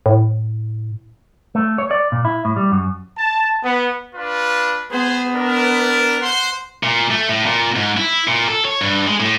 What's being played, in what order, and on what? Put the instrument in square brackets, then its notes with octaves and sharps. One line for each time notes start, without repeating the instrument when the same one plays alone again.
[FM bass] A2
[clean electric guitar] A3
C#5
D5
A#2
E4
A2
G3
F#2
[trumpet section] A5
B3
D4 F4 B4
[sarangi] B3 [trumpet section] G#4 C5
[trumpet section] D4 A#4
C5 F#5 C6
[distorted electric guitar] A#2
A3
A2
A#2
G#2
E4
A#2
A4
C#5
G2
G#3
A2